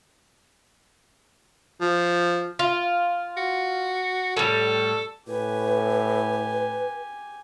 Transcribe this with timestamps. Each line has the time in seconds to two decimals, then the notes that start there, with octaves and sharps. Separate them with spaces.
1.81 F3
2.59 F4
3.37 F#4
4.37 A2 G3 A4
5.28 A2 G4 B4 G#5